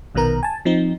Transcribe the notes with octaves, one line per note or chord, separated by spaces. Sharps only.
A#1 B2 D#3 B3 A#4 A#5
G#5 A5
F3 C4 D#4